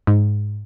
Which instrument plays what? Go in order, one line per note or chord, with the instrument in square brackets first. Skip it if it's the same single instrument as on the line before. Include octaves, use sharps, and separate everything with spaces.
[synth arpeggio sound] G#2